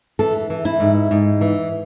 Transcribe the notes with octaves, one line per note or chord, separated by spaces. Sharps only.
E3 A4
E3
E4
G#2
G#2
E3